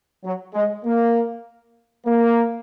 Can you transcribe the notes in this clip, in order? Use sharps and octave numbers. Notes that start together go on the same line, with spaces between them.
F#3
G#3
A#3
A#3